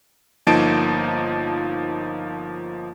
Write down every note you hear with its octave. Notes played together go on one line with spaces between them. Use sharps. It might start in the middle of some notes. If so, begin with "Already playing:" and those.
G1 F3 A#3 D#4 A5 D7